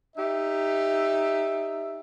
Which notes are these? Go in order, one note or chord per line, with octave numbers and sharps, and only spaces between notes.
D#4 G4 E5